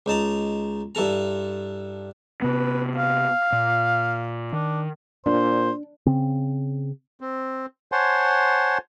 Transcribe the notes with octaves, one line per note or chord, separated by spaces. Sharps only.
C#2 D#4 A5 A#5
G2 E4 A4 A#5
C3 B3 B4
F5
A#2
D#3 D4
A#2 D4 C5
C#3 C4
C4
C5 C#5 F#5 G#5 A5 C6